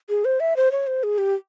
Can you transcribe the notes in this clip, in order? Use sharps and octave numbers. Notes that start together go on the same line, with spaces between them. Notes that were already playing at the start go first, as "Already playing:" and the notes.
G#4
C5
E5
C5
C#5
C5
G#4
G4